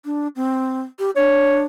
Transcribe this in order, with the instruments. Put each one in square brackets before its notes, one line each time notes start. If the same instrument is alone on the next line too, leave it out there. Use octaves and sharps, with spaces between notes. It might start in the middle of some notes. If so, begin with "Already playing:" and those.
[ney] D4
C4
G4
[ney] D4 [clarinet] C#5